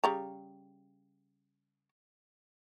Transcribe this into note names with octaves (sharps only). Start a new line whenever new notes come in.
C#3 G3 A#5